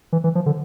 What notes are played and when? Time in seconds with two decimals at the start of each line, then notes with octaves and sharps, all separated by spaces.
0.13 E3
0.24 E3
0.35 F3
0.46 D3